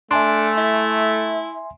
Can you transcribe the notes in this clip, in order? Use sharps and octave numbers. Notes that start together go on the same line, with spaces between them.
A3 D4 E5 G#5 C6
E4